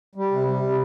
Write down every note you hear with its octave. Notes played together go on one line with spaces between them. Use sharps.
G3
C3
G3
C3